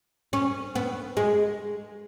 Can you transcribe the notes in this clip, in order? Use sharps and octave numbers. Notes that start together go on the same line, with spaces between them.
C#4
B3
G#3